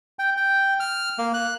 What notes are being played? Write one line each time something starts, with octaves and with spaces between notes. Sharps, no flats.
G5
G5
F6
A#3
F#6